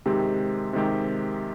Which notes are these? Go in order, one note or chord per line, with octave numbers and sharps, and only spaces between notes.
C3 D#3 G#3 C4 G4
C3 D#3 G#3 C4 G4